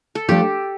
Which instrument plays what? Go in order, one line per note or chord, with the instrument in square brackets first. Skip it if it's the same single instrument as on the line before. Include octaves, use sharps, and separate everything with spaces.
[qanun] A4
[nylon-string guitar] F3 A3 D4 [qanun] G4